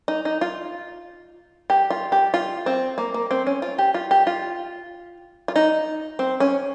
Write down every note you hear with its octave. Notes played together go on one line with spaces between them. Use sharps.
D#4
D#4
F4
G4
F4
G4
F4
C4
A#3
A#3
C4
C#4
F4
G4
F4
G4
F4
F4
D#4
C4
C#4